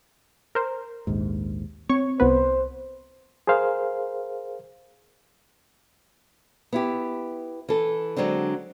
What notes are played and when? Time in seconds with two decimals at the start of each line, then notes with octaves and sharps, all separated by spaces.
0.55 A#4 C5
1.07 A#1 D#2 G#2
1.89 C4 C#5 C#6
2.20 C2 B3 B4 C5
3.47 G#4 A#4 C5 F5
6.72 B3 E4 G4
7.69 E3 A4
8.16 D3 F#3 G#3 C4 D4